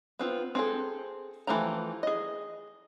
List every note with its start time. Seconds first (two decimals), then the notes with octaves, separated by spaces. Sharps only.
0.19 B3 C4 F4
0.55 C4 G#4 A4
1.47 E3 F3 A3 G4 A#5
2.03 G#4 D#5